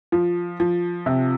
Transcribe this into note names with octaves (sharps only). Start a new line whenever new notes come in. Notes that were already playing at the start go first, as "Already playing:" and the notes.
F3
F3
C3